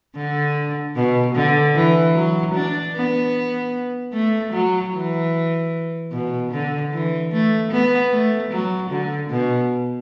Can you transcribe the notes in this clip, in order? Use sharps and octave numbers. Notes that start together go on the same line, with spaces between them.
D3
B2
D3
E3
F#3
D4
B3
A3
F#3
E3
B2
D3
E3
A3
B3
A3
F#3
D3
B2